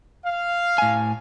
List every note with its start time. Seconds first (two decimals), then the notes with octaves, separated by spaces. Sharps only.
0.25 F5
0.78 A2 G#5